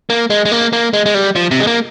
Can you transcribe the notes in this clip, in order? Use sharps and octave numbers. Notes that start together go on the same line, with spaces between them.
A#3
G#3
G#3
A#3
A#3
G#3
G#3
G3
F3
C3
G#3
A#3